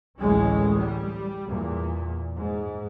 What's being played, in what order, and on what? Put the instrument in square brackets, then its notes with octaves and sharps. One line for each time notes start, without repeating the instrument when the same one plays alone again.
[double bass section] A1 D2 E3 G#3 C#4
G3
E2 A#2
G#2